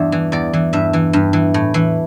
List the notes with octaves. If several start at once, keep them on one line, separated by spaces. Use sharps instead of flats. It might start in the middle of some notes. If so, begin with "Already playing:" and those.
Already playing: E2 G2 D4 E4 E5
E3
E2 D5
E3
G2 E5
E3
G2
E3
A2
E3